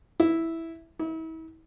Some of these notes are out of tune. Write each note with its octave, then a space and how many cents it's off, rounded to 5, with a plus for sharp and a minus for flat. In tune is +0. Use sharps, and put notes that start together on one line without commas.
E4 -5
E4 -40